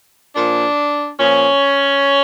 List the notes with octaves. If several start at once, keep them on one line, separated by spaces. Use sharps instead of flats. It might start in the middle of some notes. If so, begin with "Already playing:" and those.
A#2 F3 D4
A#2 F3 C#4